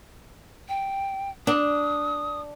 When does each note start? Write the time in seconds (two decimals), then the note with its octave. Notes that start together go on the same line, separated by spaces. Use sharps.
0.69 G5
1.47 D4 D#6